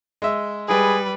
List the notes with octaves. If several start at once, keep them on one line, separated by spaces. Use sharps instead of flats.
G#3 E5
G3 G#4 B4